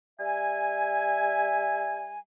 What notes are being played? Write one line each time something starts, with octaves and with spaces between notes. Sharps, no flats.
G3 E5 G#5